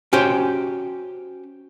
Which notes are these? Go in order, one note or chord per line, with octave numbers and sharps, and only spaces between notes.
C#4 F#4 G4 C5 G5